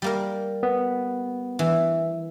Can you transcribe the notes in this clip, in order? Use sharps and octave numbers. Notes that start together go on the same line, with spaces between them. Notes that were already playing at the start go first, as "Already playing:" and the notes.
G3 A#3 A#4
B3
E3